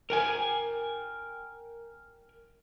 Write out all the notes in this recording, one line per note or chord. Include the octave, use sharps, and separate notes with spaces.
A#4 G5 G#5